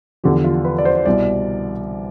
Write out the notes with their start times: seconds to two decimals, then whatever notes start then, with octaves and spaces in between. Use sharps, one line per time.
0.24 E2 D3 F3 G4
0.44 F4
0.65 B4
0.78 D5
0.85 C5
1.05 C2 B2 D5